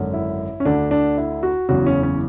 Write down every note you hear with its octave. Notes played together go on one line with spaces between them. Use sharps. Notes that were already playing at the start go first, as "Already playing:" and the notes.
Already playing: G#1 F#2 D3
E4
C#4
D2 D3 D4
D4
E4
F#4
F#1 E2 C#3 F#4
C#4
C#4